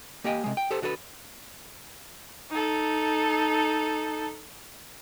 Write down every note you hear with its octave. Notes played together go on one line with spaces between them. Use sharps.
A#3 G4 D#5 G5 G#5
C3 G#3
G5
G4 A4 C5 A5
D3 F#4 A4 B4
D#4 A4